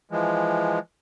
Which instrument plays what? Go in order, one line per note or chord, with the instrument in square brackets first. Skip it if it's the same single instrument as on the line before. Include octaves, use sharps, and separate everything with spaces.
[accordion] E3 F3 G#3